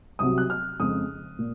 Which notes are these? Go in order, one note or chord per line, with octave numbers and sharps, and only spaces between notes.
C2 C3 F#3 D#6
F#6
F6
F2 C#3 G#3 C#4 D#6
A#2